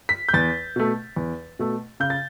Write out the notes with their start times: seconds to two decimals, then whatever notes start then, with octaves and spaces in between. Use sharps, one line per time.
0.09 B6
0.29 G6
0.34 E2 A6
0.76 B2 A3
1.16 E2
1.59 B2 A3
2.00 C#3 G6
2.10 A6